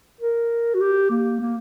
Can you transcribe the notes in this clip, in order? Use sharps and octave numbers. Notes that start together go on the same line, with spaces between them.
A#4
F#4
G4
A#3
A#3